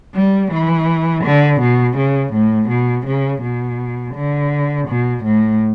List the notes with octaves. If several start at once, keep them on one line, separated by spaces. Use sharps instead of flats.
G3
E3
D3
B2
C#3
A2
B2
C#3
B2
D3
B2
A2